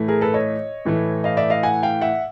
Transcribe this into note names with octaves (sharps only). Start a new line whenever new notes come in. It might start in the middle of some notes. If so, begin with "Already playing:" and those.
Already playing: A2 E3 A3
G#4 A#4
A4 B4
C#5 D#5
A2 E3 A3
D#5 F5
D5 E5
D#5 F5
F#5 G#5
F5 G5
E5 F#5